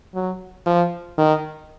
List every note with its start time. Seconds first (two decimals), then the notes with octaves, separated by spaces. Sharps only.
0.15 F#3
0.66 F3
1.18 D#3